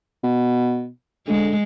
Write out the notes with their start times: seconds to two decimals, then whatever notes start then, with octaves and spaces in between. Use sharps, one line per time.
0.24 B2
1.27 D3 G#3